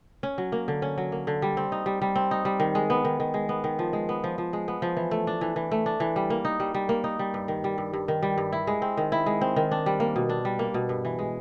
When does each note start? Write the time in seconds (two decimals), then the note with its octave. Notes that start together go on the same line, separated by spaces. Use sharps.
0.23 C#4
0.38 F#3
0.52 A#3
0.68 D3
0.82 C#4
0.98 F#3
1.12 A#3
1.27 D3
1.42 G3
1.57 C4
1.72 D#4
1.86 G3
2.02 G3
2.16 C4
2.31 D#4
2.45 G3
2.60 D#3
2.75 G#3
2.90 B3
3.05 D#3
3.20 D#3
3.34 G#3
3.49 B3
3.64 D#3
3.79 F3
3.93 G#3
4.09 B3
4.24 F3
4.38 F3
4.53 G#3
4.68 B3
4.82 F3
4.97 E3
5.11 A3
5.27 D4
5.41 E3
5.56 E3
5.71 A3
5.86 D4
6.00 E3
6.16 G3
6.30 A#3
6.45 D#4
6.60 G3
6.74 G3
6.89 A#3
7.04 D#4
7.19 G3
7.34 G2
7.48 D#3
7.64 G3
7.78 G2
7.93 G2
8.08 D#3
8.23 G3
8.38 G2
8.52 E4
8.67 G#3
8.82 C4
8.97 D#3
9.12 E4
9.26 G#3
9.41 C4
9.56 D#3
9.71 D4
9.86 G3
10.00 A#3
10.16 B2
10.29 D4
10.45 G3
10.59 A#3
10.74 B2
10.89 G2
11.05 E3
11.19 G#3